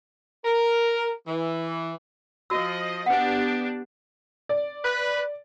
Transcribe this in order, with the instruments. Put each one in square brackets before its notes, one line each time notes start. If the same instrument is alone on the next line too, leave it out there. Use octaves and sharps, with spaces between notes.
[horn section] A#4
E3
[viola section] F3 D#5 [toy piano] F#4 E6
[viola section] B3 D4 G4 [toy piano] B4 F#5
[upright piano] D5
[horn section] B4